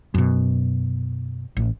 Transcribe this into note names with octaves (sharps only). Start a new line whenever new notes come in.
F#2 B2
A1